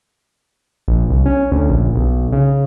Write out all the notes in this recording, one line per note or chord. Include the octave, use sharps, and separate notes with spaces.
A#1
C2
C#4
D2
A#1
B1
C#3